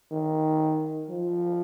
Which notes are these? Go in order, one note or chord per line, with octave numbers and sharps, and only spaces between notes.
D#3
F3